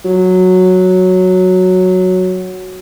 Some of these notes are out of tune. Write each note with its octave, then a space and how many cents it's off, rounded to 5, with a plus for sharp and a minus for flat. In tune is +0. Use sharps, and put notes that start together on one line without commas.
F#3 -5